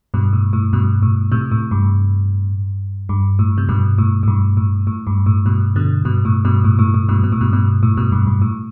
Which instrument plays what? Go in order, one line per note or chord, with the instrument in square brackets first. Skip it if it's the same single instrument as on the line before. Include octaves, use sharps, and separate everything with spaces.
[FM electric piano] G2 B2
A2
A2
G2 B2
A2
A2 C3
A2
G2
G2
A2
C3
G2 B2
A2
A2
G2
A2
A2
G2
A2
G2 B2
B2 D3
G2 B2
A2
G2 B2
A2
A2
A2
G2 B2
B2
A2
G2 B2
G2 B2
A2
G2 B2
G2
G2
A2